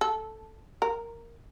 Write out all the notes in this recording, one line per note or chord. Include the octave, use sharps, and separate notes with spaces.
A4
A#4